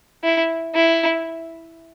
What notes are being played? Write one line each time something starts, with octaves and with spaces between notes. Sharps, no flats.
E4
E4